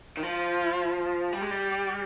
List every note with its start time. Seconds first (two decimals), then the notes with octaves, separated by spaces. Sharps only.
0.17 D#3
0.23 F3 F4
1.32 G3 G4
1.42 G#3
1.51 G3